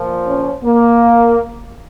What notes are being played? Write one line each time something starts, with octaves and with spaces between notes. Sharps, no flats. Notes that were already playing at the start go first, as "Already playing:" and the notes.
Already playing: A#2 F3
C#4
A#3